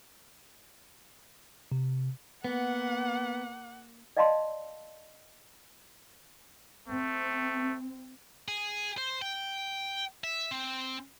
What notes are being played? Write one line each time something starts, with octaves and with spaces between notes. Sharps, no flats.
C3
A#3 B3 F#5
D5 D#5 F5 A5 B5 C6
A3 C4
G#4
C5
G5
E5
C4